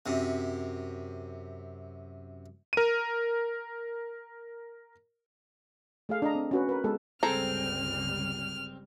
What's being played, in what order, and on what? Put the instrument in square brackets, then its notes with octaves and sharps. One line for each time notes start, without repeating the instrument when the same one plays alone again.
[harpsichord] F#2 C3
[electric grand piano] A#4 D#7
[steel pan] A3 G#4 F5
D4 D#5 A#5
C4
C#4 F#4 B4
A#4 B4
G#3 B3 A4
[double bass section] G1 C#2 G3 [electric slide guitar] C4 [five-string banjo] G#4 A4 A#5 [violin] F6